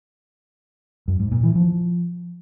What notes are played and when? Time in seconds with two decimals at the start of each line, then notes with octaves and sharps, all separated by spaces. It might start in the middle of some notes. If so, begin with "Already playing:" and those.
1.08 F#2
1.20 G#2
1.32 A#2
1.43 E3
1.55 F3